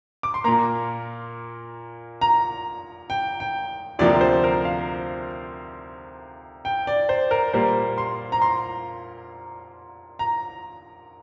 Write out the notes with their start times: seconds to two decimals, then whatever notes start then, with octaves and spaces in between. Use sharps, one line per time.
0.23 D6
0.34 C6
0.44 A#2 A#3 A#5
2.21 A#5
3.10 G5
3.40 G5
3.99 D2 C3 F3 A#3 D5
4.21 C5
4.44 A#4
4.65 F5
6.65 G5
6.87 D5
7.09 C5
7.31 A#4
7.53 A#2 G3 A#3 C5
7.98 C6
8.32 A#5
8.42 C6
10.19 A#5